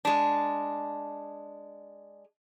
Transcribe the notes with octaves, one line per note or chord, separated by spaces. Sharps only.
G#3 D4